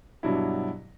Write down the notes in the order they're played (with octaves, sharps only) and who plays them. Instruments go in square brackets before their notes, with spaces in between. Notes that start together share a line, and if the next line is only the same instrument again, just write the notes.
[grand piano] G2 B2 F#3 D4 E4